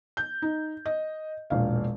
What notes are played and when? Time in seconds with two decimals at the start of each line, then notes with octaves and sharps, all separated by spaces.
0.17 G6
0.42 D#4
0.86 D#5
1.50 E1 A#1 F5